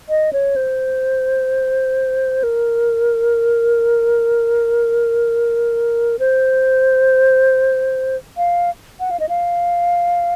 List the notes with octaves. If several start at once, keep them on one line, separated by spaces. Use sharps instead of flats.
D#5
C#5
C5
A#4
C5
F5
F#5
F5
D#5
F5